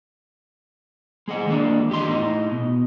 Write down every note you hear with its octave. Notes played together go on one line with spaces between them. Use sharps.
G#3 G#4 D#5 F#5
D#3 G#3 A#3 D4
E2 G4 D#5 C6
A2 D#4 D#5
B2